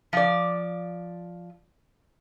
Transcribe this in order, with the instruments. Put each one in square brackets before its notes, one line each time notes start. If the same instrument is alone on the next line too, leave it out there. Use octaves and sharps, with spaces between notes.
[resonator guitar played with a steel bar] F3 D5